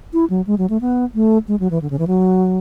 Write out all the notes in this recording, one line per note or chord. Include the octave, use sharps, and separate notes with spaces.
E4
F#3
G#3
F#3
A3
B3
A3
G#3
F#3
E3
D3
C#3
E3
F#3